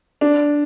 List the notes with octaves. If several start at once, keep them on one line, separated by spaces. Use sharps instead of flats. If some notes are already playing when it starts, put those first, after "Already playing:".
D4